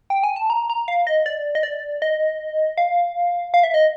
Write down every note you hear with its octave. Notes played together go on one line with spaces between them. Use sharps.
G5
G#5
A5
A#5
A#5
F5
D#5
D5
D#5
D5
D#5
F5
F5
E5
D#5